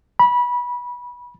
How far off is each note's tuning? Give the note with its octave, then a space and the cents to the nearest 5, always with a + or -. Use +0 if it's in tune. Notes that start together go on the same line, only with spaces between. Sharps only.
B5 -20